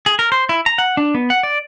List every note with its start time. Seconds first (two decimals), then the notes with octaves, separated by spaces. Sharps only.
0.06 G#4
0.19 A#4
0.32 C5
0.49 E4
0.66 A#5
0.78 F#5
0.97 D4
1.15 B3
1.30 F#5
1.43 D5